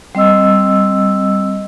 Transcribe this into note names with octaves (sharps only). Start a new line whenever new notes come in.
G3 C4 D#5 E6